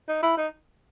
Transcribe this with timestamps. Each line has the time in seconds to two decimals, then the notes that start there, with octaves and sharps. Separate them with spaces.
0.08 D#4
0.23 E4
0.38 D#4